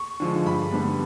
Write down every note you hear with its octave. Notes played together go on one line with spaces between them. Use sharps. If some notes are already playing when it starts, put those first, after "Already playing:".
Already playing: C#6
D3 F3 G#3
G2 B5
D3 G3 B3